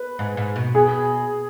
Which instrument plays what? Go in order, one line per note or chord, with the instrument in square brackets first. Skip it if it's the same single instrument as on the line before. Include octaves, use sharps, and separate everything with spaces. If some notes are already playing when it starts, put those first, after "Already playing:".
Already playing: [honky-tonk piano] B4
[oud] G#2
G#2
B2
[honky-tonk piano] G#4